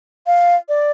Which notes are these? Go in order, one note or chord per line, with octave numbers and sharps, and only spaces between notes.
F5
D5